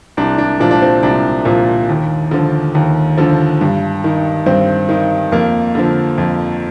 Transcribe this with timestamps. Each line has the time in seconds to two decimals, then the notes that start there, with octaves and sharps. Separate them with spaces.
0.17 C2 D4
0.38 D4
0.60 A#2 F3 D4
0.71 D4
0.82 C4
1.03 C2 D4
1.45 A#2 F3
1.89 D#2
2.31 D3 F3
2.75 D#2
3.17 D3 F3
3.61 G2
4.04 D#3
4.46 G2 C4
4.89 D#3
5.32 F2 A#3
5.75 D3 F3
6.18 F2